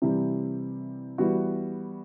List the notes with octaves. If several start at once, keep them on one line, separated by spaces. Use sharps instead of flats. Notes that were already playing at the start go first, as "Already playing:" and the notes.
C3 E3 G3
E3 G3 B3 F#4